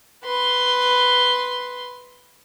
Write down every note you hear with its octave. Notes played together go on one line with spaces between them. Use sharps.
B4 C6